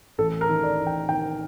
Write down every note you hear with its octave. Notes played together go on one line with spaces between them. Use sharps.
A1 A4
A#4
D#3
D5
A1
G5
D#3 G5